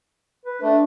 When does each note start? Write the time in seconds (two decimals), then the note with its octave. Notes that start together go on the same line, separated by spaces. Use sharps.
0.46 B4
0.62 A3 D4